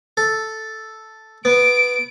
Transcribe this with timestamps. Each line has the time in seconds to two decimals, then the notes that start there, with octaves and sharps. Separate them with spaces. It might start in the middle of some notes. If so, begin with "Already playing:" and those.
0.17 A4
1.45 B3 D7